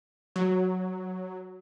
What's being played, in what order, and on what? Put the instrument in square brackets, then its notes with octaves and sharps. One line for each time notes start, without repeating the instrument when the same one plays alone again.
[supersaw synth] F#3